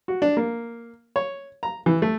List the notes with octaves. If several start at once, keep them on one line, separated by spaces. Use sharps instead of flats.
F#4
D4
A#3
C#5
A#5
E3
A3